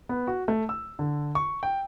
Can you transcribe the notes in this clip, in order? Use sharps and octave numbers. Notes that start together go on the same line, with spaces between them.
B3
F#4
A3
E6
D3
C#6
G5